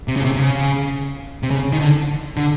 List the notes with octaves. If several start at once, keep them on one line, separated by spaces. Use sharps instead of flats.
C3
C#3
C3
C#3
C3
C#3
D#3
D3
D3